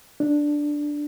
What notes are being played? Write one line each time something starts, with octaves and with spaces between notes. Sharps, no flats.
D4